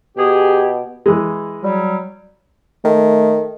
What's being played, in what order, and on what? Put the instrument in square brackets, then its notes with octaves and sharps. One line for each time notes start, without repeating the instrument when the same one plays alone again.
[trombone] B2 [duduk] G4 [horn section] G#4
[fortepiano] E3 G#3
[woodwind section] F#3 G3
[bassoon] D#3 [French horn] A3